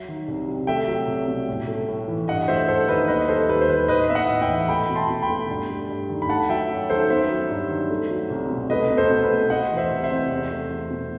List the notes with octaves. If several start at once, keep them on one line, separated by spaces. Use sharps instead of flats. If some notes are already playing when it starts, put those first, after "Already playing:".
Already playing: F#3 E5
D#3
C2
C3
A3 E5 G5
F#3
C2
B2
A2
A3
A2
E3
G2 D#5 F#5
A3 C5 E5
G2 A4 C5
D#3 B4 D#5
D#2 B4 D#5
G3 A4 C5
D#2 B4
C5
D#3 B4
A2 B4 D#5
B3 E5
D#5 F#5
A2
E5 G5
E3
A3 G5 B5
B2
A5 C6
B2
G5 B5
A3
G2
A3
G2
D#3
B5
A3 F#5 A5
F#3 E5 G5
F#2
D#3 A4 C5
B3 C5 E5
F#3
G2
D#3
A3
F#3
C2
B2
A3 B4 D#5
B2
A4 C5
B2
B4
A3
A3 D#5 F#5
E3
C5 E5
C2
C5 E5
C3
E2
A3
E2
B2